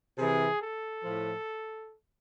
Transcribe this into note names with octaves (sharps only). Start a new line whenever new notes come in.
C3 E3 G#4
A4
A2 F3